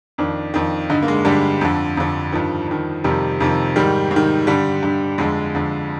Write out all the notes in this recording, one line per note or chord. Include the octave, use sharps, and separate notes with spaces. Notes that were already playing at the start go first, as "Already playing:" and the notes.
F2 D#3 D4
F2 D#3
G2 D3 D#4
A#3
G#3
G2 D3 G3
F2 D3
F2 D3
G2 D#3 F3
G2 D#3
F2 C3 D#3 G3
F2 C3 D#3
G#2 D#3 G3
G#2
D#3
G2 D3 G3
G2 D3
F2 D3 G#3
F2 D3